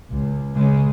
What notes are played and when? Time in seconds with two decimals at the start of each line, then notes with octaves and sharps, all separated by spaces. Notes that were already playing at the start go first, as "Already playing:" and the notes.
0.10 C#2
0.55 C#3 G#3